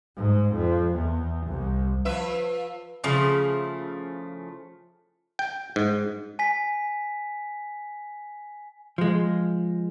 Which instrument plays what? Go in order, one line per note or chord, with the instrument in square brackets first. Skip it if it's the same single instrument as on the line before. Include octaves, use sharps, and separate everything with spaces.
[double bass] G#2
F2
E2
C2
[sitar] F3 B4 E5
[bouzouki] C#3 F3 A3 E4
[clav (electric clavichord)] G5
G#2
[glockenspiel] G#5 B6
[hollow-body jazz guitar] F3 G#3